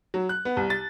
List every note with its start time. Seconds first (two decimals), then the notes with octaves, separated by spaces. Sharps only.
0.14 F#3
0.29 F#6
0.45 B3
0.57 C2
0.70 A6